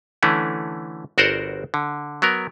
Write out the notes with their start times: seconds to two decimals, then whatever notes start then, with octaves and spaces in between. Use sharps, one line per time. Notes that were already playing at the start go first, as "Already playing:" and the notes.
0.23 D3 E3 A3 C#4
1.18 G1 F#4 A#4 C5 D5 F#5
1.74 D3
2.22 F#3 B3 A#4